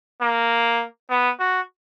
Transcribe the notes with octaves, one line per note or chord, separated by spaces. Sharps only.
A#3
B3
F#4